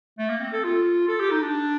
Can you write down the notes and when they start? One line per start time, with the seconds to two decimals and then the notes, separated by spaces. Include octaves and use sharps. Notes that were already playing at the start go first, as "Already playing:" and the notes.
0.19 A3
0.29 A#3
0.41 C4
0.53 A4
0.64 F4
1.08 A4
1.20 G4
1.31 D#4
1.42 D4